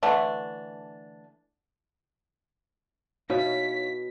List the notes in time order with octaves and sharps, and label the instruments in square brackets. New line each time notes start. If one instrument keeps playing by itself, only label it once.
[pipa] D3 E3 A3 D4
[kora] B2 [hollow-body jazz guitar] D#4 E4 F5 [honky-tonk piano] C#5 [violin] B6